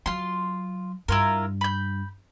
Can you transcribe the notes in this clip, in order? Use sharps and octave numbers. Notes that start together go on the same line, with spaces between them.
F#3 F4 C6
G2 E4 F4 A#4
B5 G6